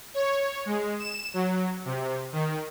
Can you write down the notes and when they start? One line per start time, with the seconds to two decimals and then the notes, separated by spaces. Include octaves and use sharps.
0.14 C#5
0.66 G#3
0.99 E7
1.34 F#3
1.85 C3
2.32 D#3